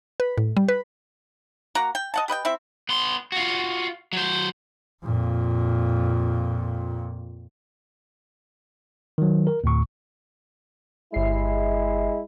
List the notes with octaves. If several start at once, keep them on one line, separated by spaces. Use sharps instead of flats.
B4
A2
G3
B4
A#3 F#4 F#5 A#5
G5
D#5 F#5 A5
G4 B4 D#5 G5
C4 E4 E5
B3 C6
F4 F#4
F#3 C5
F2 A#2
D#3 F#3
A#4
D2 A2 C#6
G1 G#3 E4 C7